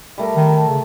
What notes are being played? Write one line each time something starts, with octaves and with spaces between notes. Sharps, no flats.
G3 A3 A#4
D#3
A4
C#3